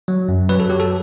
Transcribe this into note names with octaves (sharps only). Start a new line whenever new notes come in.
F#3
F#2
F#3 B4
A4
F#3 G4
A4